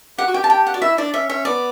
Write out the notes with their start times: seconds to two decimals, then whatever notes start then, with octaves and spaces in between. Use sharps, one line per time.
0.18 G4 F#5
0.27 F#4
0.34 G4 G5
0.44 A5
0.50 G5
0.67 F#5
0.74 F#4 D5
0.82 E4 E5
0.97 D4 D5
1.13 C#4 E5
1.29 C#4 E5
1.45 B3 D5